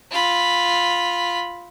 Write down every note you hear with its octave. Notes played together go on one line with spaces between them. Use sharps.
F4 B5